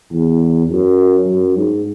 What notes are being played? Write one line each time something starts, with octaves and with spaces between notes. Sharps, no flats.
E2
F#2
F#2
G#2